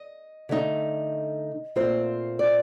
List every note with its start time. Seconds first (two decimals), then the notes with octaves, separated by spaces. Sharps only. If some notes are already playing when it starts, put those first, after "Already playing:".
Already playing: D#5
0.49 D3 A3 D#4
1.76 A#2 A3 C4 F4 C5
2.39 D5